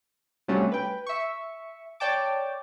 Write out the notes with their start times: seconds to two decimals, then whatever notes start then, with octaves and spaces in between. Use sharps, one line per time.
0.48 C3 F#3 G3 A3 C#4 D4
0.72 B4 G5
1.07 E5 C#6
2.00 C#5 D5 G5 A5 D6